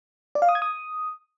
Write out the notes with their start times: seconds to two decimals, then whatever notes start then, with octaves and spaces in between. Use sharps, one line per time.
0.35 D5
0.42 F5
0.49 D#6
0.55 G#6
0.62 D#6